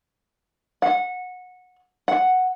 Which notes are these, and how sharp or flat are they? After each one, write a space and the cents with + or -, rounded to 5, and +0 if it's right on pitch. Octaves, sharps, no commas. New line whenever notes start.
F#5 -20
F#5 +0